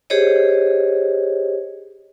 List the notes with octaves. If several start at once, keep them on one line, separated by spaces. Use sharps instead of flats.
G4 G#4 C5 C#5 D#5